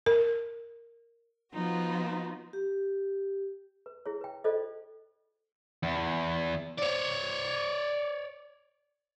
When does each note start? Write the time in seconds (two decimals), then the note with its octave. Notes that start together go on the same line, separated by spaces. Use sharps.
0.06 A#4
1.54 F3 B3 D#4 F4 F#4
2.53 G4
3.86 B4
4.06 E4 G#4 C#5
4.21 B4 G5
4.44 F4 A4 C5 D5 D#5
5.83 E2
6.79 C#5 D5